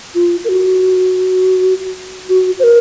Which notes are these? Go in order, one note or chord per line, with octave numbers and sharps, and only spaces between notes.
F4
A#4
F#4
F#4
C5
A#4